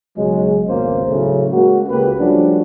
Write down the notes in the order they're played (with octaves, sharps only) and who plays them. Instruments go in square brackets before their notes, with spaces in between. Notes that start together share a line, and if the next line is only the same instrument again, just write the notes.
[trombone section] B1 C#3 F#3 G#3
G#1 C#2 B2 A#3 C#4 C5
A2 C#3 F#3 A3
G#3 A#3 C#4 F#4
C#2 C#3 A#3 G4 B4
F3 G3 A3 C#4 D4 F#4